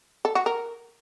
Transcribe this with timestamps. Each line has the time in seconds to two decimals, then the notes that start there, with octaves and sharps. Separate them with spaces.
0.25 A4
0.35 F#4
0.46 A#4